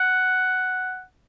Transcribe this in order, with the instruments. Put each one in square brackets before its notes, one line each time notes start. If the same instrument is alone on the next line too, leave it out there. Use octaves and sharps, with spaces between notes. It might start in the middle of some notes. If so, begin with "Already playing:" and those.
Already playing: [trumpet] F#5